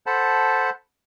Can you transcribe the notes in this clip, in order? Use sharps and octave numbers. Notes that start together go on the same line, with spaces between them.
A4 C5 F#5 A5 B5